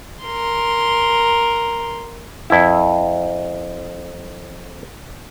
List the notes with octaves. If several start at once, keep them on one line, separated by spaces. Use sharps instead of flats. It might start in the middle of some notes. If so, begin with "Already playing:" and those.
A#4 C6
F2 E4